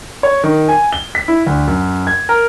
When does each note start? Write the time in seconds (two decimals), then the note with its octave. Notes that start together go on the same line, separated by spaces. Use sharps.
0.23 C#5
0.44 D#3
0.69 G#5
0.93 G7
1.15 B6
1.28 E4
1.46 D2
1.68 F#2
2.07 G#6
2.29 A#4